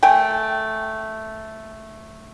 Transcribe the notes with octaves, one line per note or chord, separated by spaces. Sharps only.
A3 G5 G#5